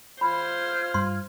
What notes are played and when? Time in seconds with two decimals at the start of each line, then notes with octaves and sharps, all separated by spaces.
0.21 F4 C5 B5 F6 G#6
0.94 G2 C6